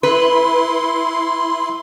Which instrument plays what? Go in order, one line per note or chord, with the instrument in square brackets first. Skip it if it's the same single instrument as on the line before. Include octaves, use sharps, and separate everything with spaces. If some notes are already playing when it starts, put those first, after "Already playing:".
[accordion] E4 C6 [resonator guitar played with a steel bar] B4